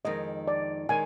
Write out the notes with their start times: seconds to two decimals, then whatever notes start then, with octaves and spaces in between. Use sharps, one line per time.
0.05 F2 D#3 G#3 D#5
0.47 D5
0.89 D#3 G#3 G#5